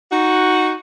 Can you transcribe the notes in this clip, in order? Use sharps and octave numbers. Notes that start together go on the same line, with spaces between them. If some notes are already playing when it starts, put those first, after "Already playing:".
D#4 F#4